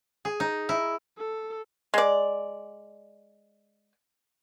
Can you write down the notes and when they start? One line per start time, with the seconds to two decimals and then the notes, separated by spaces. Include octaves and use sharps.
0.25 G#4
0.40 D#4
0.69 E4
1.18 A4
1.94 G#3 D5